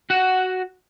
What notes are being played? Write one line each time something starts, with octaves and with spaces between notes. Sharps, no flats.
F#4 F#5